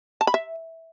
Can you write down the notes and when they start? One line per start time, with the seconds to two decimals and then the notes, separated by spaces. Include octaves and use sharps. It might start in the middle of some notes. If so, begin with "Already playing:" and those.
0.21 A5
0.27 B5
0.34 E5